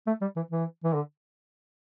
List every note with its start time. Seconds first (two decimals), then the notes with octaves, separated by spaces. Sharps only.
0.07 A3
0.21 G3
0.36 E3
0.51 E3
0.84 E3
0.94 D3